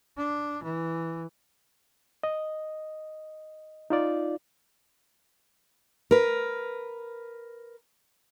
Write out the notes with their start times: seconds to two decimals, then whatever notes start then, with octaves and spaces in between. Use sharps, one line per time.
0.17 D4
0.63 E3
2.23 D#5
3.90 D#4 F4 D5
6.11 A#4 B4